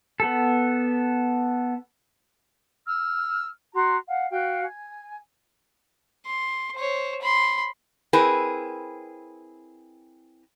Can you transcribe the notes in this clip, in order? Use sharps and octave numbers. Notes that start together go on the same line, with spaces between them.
B3 A4
E6 F6
F#4 A#5 C6
F5 F#5
F#4 F5 G5
G#5
C6
C5 C#5
B5 C6
C4 E4 G#4 A#4 B4